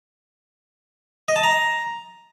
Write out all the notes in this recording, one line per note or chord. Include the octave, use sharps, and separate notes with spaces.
D#5
A5
A#5